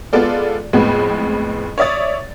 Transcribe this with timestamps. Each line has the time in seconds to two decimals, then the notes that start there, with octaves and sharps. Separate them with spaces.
0.13 G#3 B3 F4 A4 D5
0.73 F2 A2 G#3 B3 C4
1.78 C#5 D5 E5 D#6 A6